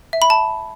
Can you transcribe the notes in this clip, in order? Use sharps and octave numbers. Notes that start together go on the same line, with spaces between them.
E5
B5
A5